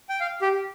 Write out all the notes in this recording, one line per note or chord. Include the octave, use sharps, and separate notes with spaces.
G5
F5
G4